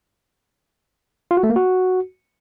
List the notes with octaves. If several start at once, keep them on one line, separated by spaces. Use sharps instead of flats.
F4
F#4
A3
A#3
F#4